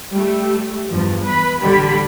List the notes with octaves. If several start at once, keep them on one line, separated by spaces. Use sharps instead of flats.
G3 A3
E2 G2 F3
B4 B5
A1 D3 G3 B5